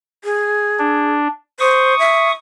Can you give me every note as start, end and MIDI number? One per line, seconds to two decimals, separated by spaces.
0.24 1.13 68
0.79 1.28 62
1.60 1.97 72
1.60 2.32 85
1.60 2.32 87
1.99 2.30 76